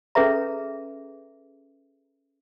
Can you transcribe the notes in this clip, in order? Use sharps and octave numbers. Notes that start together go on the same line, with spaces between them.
C#4 G#4 A4 B4 E5 A#5